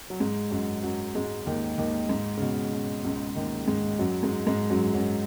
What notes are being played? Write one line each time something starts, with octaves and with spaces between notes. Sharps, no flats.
F#3
G#2 G#3
F#2 F#3
F#2 F#3
G#2 G#3
D#2 D#3
D#2 D#3
G#2
C#3
B2
B2
C#2 C#3
D#2 D#3
G#2 G#3
F#2 F#3
G#2 G#3
G#2 G#3
F#2 F#3
F#2 F#3